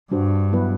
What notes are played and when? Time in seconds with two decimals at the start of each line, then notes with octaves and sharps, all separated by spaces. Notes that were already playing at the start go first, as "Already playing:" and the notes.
0.11 G2 G3 D4 F#4 C5
0.53 F#3 B3 E4 B4